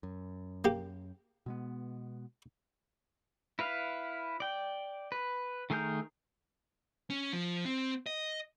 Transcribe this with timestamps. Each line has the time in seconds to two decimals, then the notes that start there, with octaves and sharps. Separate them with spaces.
0.03 F#2
0.65 A#3 G4
1.46 B2 G#3 B3
3.59 E4 B4 F5
4.40 D5 G5
5.12 B4
5.70 D#3 A3 G#4 A#4 G6
7.10 C#4
7.33 F3
7.65 C4
8.06 D#5